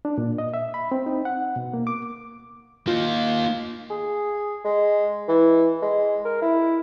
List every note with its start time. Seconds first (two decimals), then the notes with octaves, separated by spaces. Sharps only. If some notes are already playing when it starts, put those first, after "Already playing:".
0.05 D4
0.18 A#2
0.38 D#5
0.54 E5
0.74 B5
0.92 C4
1.06 D#4
1.25 F#5
1.56 B2
1.74 A#3
1.87 D6
2.87 A#3 D#4 F4
3.90 G#4
4.65 G#3
5.28 E3
5.82 G#3
6.25 A#4
6.42 E4